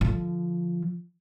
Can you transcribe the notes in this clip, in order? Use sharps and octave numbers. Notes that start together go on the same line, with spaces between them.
D3 F3